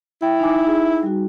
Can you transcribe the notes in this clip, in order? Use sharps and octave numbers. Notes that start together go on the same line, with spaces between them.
E4 G5
D#4 G#5 D6
D#4 G#4
G3 F#4